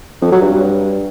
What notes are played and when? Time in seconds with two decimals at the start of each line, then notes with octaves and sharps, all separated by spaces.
0.22 F2
0.32 F#3
0.42 G2